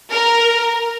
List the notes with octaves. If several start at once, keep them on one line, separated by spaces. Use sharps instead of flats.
A#4